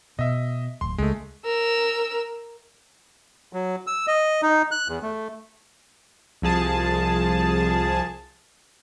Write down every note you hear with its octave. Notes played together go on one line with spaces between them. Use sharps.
B2 D#5 E5
D1 C6
C#2 G#3 A3
A#4 E6
F#3
E6
D#5
D#4
F#6
E2
A3
C2 F3 G#4 A5